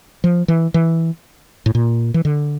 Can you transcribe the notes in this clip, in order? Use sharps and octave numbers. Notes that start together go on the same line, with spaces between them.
F3
E3
E3
A2
A#2
E3
D3